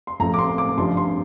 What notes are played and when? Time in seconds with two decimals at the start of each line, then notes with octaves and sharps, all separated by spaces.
0.07 C6
0.20 A1 A2 F3 A3 A#5
0.34 D6
0.39 C6
0.58 D6
0.77 A1 G2 F3 C6
0.97 C6